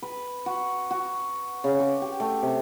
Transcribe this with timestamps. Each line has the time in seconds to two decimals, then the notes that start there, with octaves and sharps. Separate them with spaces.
0.02 B4
0.46 F#4
0.91 F#4
1.64 C#3
1.80 D6
2.02 G4
2.20 A3
2.43 C3